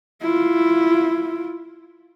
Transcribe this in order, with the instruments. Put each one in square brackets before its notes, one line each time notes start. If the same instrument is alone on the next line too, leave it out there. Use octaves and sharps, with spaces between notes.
[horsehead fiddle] E4 F4